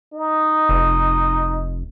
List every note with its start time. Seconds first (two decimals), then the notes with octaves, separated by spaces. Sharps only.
0.13 D#4
0.69 F1